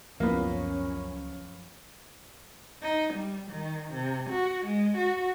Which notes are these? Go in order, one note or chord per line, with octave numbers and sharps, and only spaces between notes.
C#2 F#2 F3 A#3 B3 C#4
D#4
G3
D#3
C3
F#4
G#3
F#4